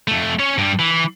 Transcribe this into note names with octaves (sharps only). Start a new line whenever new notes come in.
F2 A3
C#4 C#5
G2 G3
E3